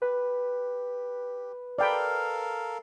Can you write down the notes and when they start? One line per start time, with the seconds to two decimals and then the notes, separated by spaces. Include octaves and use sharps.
0.02 G4 B4
1.78 A4 A#4 D5 F5 G5 B5